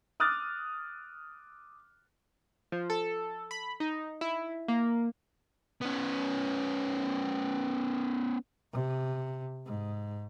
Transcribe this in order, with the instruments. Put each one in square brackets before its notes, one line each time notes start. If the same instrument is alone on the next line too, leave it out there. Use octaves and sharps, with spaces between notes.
[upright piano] D6 D#6 F6 F#6 A6
[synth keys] F3
A4
B5
D#4
E4
A#3
[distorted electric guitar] B3 C#4
[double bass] C3
G#2